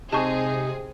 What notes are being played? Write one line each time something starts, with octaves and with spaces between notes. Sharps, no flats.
C3 G#3 C4 D#4 G#4 A5 C#6